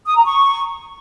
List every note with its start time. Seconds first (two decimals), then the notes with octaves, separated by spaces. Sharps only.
0.06 D#6
0.15 A#5
0.24 C#6